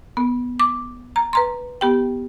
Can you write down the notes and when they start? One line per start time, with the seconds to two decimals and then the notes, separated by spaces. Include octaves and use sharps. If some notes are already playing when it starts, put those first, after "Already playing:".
0.17 B3
0.60 D6
1.16 A#5
1.33 B4 A#5 C6
1.81 B3 G4 G5